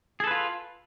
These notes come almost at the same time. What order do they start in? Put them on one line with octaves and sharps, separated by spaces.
G#4 A4 B4 F4